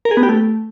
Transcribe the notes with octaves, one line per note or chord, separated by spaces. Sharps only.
A#4
G#4
B3
G4
A3